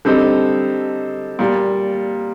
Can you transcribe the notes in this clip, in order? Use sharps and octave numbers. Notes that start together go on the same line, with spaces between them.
D3 G3 C4 D#4 A4
A#2 G3